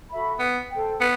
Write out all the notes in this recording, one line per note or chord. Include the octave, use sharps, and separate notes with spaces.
F#4 A4 E5 B5
B3
A4 C5 G5
B3